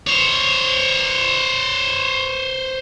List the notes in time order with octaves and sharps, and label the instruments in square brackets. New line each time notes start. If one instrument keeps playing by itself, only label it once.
[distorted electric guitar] C5 C#5